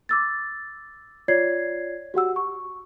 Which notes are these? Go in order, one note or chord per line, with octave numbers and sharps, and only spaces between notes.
D6 E6 A6
F4 C#5 D5 G#6 C7
F#4 G4 F#5 E6
C#6